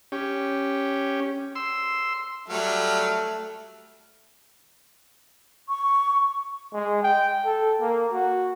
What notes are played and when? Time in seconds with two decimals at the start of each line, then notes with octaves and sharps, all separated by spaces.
0.12 C#4 G4
1.55 C6 E6
2.50 F#3 G3 A3 F6
5.69 C#6
6.73 G#3
7.03 G5
7.45 A4
7.80 A#3
8.12 F#4